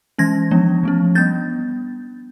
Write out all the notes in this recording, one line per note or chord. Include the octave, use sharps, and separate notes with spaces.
E3 G#3 C#4 G#6 A#6
F3 G#3 B3 D4
F3 A3 C#4
G3 B3 D4 G6 A6